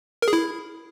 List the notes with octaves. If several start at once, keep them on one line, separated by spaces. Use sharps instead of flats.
A#4
G#4
E4